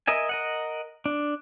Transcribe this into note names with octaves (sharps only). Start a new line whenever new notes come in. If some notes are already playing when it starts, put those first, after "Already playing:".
A#4 D#5 E5 G#5
A#4 D#5 F#5
D4